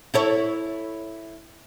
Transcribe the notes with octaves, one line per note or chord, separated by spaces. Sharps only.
E4 A4 C#5